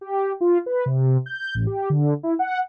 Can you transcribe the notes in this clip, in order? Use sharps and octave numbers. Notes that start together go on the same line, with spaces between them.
G4
F4
B4
C3
G6
A1
G4
D3
E4
F#5